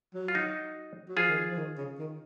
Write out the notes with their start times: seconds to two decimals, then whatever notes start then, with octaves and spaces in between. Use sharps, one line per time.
0.14 F#3
0.28 F4
0.35 D#4 F#4
1.08 F#3
1.17 F3 F4 G#4
1.29 D#3
1.37 F3
1.51 F3
1.57 D#3
1.78 C#3
1.99 D#3